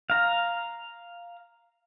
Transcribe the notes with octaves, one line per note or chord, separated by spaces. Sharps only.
F5 A#5